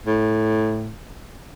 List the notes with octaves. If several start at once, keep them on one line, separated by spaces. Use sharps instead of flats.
A2